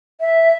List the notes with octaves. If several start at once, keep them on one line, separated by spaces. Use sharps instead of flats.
E5